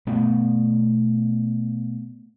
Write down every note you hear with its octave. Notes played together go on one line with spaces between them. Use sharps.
B2 A3 B3